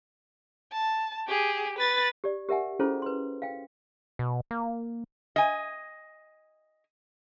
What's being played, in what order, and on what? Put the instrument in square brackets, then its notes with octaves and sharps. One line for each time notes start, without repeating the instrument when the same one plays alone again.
[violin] A5
G4 G#4
B4 A6
[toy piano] G4 D5
G4 A#4 E5 F#5 G#5
C#4 E4 F4 G#4 A4 C5
B4 C6
F5 G5
[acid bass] B2
A#3
[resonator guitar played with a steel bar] D#5 G#5